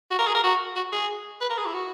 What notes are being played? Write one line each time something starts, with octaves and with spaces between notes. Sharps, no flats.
F#4
A#4
G#4
A#4
F#4
F#4
G#4
B4
A#4
G#4
E4
F#4